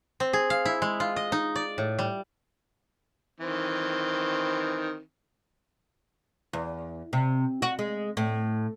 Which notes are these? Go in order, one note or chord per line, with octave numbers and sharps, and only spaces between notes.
C4
G#4
F5
E4
G#3
F4
D#5
D#4
D5
A2
G3
D#3 E3 C4
E2
C3
F#4
G#3
A2